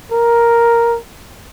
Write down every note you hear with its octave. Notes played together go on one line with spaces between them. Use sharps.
A#4